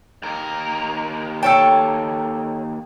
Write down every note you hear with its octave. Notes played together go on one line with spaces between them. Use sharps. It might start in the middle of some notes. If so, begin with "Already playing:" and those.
D#2 A#4
A4 C#5 G5 A5